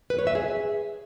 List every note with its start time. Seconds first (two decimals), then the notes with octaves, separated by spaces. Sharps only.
0.10 B4
0.19 C#5
0.27 E5
0.35 G#4